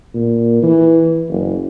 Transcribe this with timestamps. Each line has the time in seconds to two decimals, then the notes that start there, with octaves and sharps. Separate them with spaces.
0.15 A#2
0.63 E3
1.29 F#1